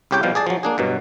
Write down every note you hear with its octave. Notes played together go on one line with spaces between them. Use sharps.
C2 C#3 G4 C#5 G5
B2 F3 G3 F5
G#4 D5 A5
F3 F#3
A#3 D4 G#4
G2 B2 F#3